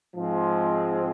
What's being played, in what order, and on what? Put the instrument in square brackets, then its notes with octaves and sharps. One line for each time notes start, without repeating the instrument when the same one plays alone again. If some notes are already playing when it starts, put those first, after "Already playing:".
[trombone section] G#2 F3 G#3 C4